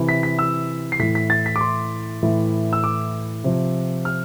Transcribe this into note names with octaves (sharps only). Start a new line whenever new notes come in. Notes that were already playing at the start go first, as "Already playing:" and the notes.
Already playing: C3 E3
B6
B6
E6
C7
A2 E3 B6
B6
A6
B6
D6
C6
A2 E3
E6
D6
C3 F3
F6